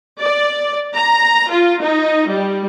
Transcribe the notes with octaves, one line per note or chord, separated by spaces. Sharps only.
D5
A#5
F4
D#4
G3